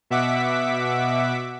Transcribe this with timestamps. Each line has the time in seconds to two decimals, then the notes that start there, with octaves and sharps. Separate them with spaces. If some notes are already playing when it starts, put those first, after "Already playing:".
0.10 B2 E5 F#5 D6 B6